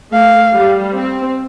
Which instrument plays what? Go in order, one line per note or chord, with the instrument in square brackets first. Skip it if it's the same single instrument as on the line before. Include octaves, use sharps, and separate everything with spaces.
[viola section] A3 [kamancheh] F5
[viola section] G3
C4